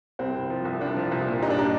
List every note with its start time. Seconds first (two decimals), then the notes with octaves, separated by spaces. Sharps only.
0.19 C2 C4
0.35 C2
0.50 F3
0.65 C2
0.81 C2 D4
0.96 F3
1.12 C2
1.27 A#2
1.42 G2 D#4
1.50 D4
1.57 G3 D#4